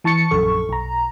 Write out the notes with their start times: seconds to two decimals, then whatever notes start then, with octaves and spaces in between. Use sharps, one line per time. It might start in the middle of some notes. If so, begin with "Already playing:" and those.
0.04 E3 A5 C#6 A6 C#7
0.31 A#1 F#2 A4 C#6
0.69 B1 A#5